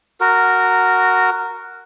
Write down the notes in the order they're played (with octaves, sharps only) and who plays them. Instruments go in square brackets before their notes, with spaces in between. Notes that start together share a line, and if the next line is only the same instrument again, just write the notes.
[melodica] F#4 A#4